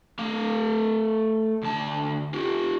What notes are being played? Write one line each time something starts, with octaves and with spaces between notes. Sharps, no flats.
A3 F5
D2 A5
F4 G4